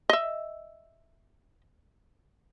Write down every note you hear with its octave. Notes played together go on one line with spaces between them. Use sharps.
D#5 E5